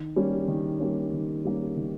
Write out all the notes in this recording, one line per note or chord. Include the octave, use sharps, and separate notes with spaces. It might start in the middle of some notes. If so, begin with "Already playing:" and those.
Already playing: D#3
G3 A#3 C#4
D#3
G3 A#3 C#4
D#3
G3 A#3 C#4
D#3